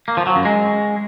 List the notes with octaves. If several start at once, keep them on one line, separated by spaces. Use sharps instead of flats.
A#3
F3
F#3
F#2
G#3